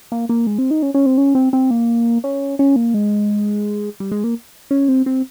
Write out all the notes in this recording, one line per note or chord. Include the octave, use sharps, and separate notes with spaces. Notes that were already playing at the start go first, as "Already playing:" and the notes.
A#3
A#3
G#3
C4
D#4
C#4
C#4
C4
C#4
C4
C4
A#3
C#4
C#4
A#3
G#3
G3
G#3
A#3
C#4
C4
C4